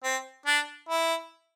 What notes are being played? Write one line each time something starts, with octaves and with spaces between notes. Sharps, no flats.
C4
D4
E4